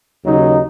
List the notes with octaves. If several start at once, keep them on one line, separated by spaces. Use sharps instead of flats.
D#2 C#3 F#3 D#4